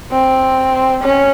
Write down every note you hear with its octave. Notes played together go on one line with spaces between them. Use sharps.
C4
C#4